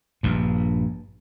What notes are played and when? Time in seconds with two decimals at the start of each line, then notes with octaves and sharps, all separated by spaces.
0.23 A#1 G2